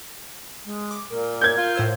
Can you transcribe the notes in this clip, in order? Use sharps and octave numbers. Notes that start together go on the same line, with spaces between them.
G#3
D6
A#2 A#4
G6 G#6
F4
A2 C5 E6